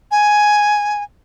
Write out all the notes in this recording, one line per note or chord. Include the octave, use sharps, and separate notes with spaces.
G#5